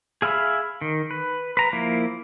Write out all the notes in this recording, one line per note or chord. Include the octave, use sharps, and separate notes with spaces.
G#4 E5 F5 B5 E6
D#3
B4
B4 A#5
F3 A#3 E4